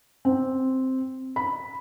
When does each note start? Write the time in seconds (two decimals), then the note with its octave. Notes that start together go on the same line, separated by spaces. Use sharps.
0.25 C4
1.36 B5